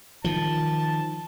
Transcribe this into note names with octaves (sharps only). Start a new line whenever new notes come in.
D#3 F3 A5